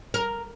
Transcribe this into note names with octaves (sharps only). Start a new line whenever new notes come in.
A#4